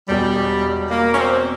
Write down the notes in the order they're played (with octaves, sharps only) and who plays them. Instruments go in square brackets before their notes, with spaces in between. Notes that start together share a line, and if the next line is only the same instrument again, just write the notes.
[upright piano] E1 E2 B2 [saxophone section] G3
[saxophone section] A#3
C#4
C4